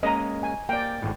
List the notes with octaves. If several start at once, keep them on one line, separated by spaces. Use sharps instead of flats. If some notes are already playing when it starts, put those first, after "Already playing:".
G#3 A#3 C#4 D#5 A#5
G#5
A#3 D5 G5
G#1 A2